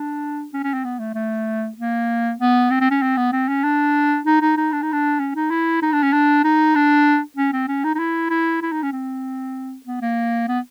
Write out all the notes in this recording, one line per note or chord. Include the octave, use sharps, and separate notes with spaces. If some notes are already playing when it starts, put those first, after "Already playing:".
Already playing: D4
C#4
C#4
C4
B3
A3
A3
A#3
B3
C4
C4
C#4
C4
B3
C4
C#4
D4
D#4
D#4
D#4
D4
D#4
D4
C#4
D#4
E4
D#4
D4
C#4
D4
D#4
D4
C#4
C4
C#4
D#4
D#4
E4
E4
E4
D#4
C#4
C4
B3
A#3
B3